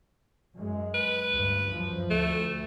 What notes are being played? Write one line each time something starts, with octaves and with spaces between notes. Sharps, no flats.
F#2 G#3
B4
D2 G2
F#2 F3
D2 A3